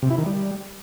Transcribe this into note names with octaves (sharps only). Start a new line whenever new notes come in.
C3
E4
D#3
G3